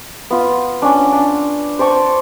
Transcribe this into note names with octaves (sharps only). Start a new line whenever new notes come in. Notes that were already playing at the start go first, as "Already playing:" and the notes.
B3 F4
C#4 D4
D4
C5 D5 A5 C#6